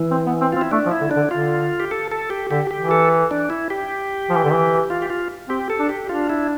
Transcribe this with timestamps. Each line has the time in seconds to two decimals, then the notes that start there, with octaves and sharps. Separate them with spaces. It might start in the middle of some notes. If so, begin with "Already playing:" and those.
Already playing: E3
0.11 C4
0.27 B3
0.41 C4
0.53 C4 F4
0.61 E4
0.71 A3 D4
0.86 F3
0.91 E4
1.01 D3
1.11 D4
1.16 D3
1.31 D3 F4
1.80 G4
1.91 A4
2.11 A4
2.30 G4
2.51 D3 G4
2.71 G4
2.80 E3
2.91 A4
3.31 D4
3.50 E4
3.70 G4
4.30 F3
4.37 E3
4.44 D3
4.51 E3
4.90 F4
5.02 G4
5.10 F4
5.49 C4 G4
5.70 A4
5.79 D4
5.89 G4
6.09 D4 F4
6.30 E4